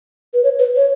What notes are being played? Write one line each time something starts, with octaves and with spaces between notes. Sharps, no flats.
B4
C#5
B4
C#5